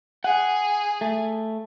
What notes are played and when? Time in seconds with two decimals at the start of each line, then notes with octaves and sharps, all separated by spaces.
0.24 G#4 F#5
1.01 A3